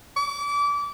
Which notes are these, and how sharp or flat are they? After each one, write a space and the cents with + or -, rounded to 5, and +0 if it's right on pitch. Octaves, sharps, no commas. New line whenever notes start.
D6 -30